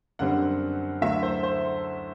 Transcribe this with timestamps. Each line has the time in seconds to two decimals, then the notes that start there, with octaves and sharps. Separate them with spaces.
0.19 F#2 D3 G3 C4 F#5
1.02 D2 D3 F#3 A3 E5
1.23 C5
1.43 C5